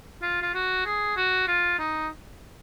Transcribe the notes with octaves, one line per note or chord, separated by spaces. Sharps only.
F4
F4
F#4
G#4
F#4
F4
D#4